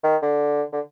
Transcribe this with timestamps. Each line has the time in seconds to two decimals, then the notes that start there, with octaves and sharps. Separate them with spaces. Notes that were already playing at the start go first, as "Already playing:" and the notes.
0.03 D#3
0.22 D3
0.72 D3